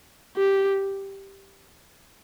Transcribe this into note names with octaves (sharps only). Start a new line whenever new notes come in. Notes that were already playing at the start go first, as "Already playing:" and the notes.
G4